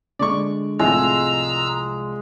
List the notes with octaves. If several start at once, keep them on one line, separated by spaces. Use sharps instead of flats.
D3 G#3 D5 C#6
C2 A2 C3 F3 G#3 A#5 E6